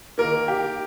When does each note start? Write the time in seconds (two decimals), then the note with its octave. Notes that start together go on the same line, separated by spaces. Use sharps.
0.18 D#3 A#3 A#4
0.48 G4